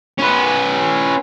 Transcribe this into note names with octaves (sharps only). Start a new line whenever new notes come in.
C#4 B4